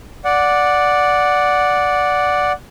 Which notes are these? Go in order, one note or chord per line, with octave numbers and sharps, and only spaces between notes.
D5 F#5